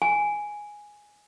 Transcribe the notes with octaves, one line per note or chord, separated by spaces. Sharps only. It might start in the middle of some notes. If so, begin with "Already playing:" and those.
G#5